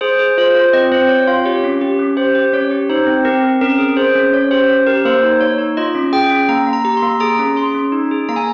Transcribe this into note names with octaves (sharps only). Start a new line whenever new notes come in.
G#4 C5
G#4
F4 C5
F4
C4 D#5
C4 C5
C4 C#5
F4 F5
G4 C#5
C#4
G4
C#4
G4 C5
G4
C#4 C#5
G4
D#4 C5
C4
C4 A#4
C4
C#4 A#4
G#4
G#4 C5
C#4
C#4 C#5
G4 C5
C#4
G4 A#4
A#3 C5
D#4
A#3 C#5
D#4
F4 D#5
C#4
G#4 G5
C#4
A#3 A#5
A#3
A#5
G4 A#5
C6
A#3
G#4 A#5
C#4
G#4 C6
C#4
D#4
G#4
A#3 A#5
G#5